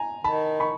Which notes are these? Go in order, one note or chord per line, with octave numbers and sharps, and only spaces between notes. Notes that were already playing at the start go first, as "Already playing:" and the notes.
Already playing: G#5 A#5
D#3 A5 B5
B5 C#6